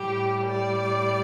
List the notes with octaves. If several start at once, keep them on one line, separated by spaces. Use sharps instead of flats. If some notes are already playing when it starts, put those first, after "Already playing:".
Already playing: A2 G3 G4
D5